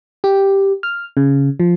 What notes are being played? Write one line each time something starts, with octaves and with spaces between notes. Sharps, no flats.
G4
F6
C#3
F3